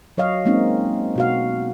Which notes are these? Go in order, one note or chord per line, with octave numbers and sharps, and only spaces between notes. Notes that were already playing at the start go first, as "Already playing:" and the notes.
F#3 C#5 D#5 F5
G#3 A#3 C4 C#4 D#4
B2 F#4 F5